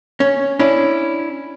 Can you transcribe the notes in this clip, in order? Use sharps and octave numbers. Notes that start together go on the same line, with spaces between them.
C#4
C#4 D4 E4